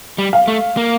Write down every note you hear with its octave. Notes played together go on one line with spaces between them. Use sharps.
G3
F5
A3
A#3